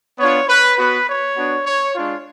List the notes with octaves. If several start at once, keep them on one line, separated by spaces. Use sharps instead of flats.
B3 D4 F4 C#5
B4
B3 F#4 B4
C#5
B3 D4 F#4
C#5
G#3 D4 F4